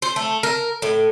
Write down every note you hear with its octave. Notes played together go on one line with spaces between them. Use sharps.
C5
A3
A#4
A2